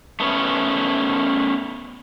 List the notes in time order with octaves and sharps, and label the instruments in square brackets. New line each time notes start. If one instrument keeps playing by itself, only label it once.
[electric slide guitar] A3 B3 C#4